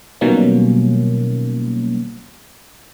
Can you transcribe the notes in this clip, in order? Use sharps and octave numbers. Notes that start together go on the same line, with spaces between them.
B2 D#3 F#3 G3 A#3 C#4